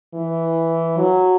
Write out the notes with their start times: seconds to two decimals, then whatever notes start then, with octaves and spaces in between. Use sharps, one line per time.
0.14 E3
0.97 F#3